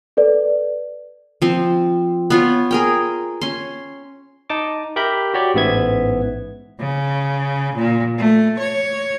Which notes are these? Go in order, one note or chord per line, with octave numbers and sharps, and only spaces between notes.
A4 B4 D5
F3 C4
B3 F4 C#5
G#4 A#4 G5
C#4 C6
D#4 A5 D6
G4 A#4 E5 B5 G6
F#4 G4 C#5 D5
A1 G#2 B3 E5 G#6
C#3
A#2
A3
C#5